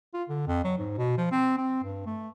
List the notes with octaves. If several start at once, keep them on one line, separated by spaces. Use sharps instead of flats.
F4
D3
F2
F#3
G#2
B2
F3
C4
C4
G2
A3